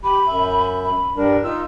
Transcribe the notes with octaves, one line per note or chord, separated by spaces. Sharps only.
G4 B5
F#2 E5
B5
G2 G3 D4 A#4
D#4 F4 E6